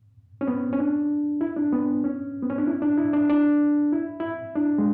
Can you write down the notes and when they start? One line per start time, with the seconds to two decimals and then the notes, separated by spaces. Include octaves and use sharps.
0.41 C#4
0.47 B3
0.73 C#4
0.79 D4
1.41 E4
1.57 D4
1.73 B3
2.04 C#4
2.42 B3
2.50 C#4
2.58 D4
2.67 E4
2.82 D4
2.97 E4
3.13 D4
3.30 D4
3.93 E4
4.20 E4
4.55 D4
4.78 G#3